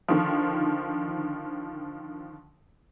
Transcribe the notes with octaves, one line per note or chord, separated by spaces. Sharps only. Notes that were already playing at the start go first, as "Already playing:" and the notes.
D3 D#3 F3